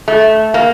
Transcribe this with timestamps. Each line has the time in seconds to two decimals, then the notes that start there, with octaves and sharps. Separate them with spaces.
0.08 A3
0.54 A#3